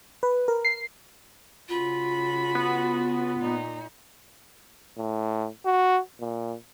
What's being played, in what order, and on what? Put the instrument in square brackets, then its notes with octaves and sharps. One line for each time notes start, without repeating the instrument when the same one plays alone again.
[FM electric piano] B4
A#4
C7
[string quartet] C#3 F#4 B5 [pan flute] F4
[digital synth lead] B3
[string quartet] A#2 D#4
[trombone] A2
F#4
A#2